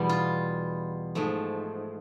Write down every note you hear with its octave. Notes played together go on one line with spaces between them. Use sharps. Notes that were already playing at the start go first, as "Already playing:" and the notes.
Already playing: E2 B2 G3 B3
F4
G#2 F3 A3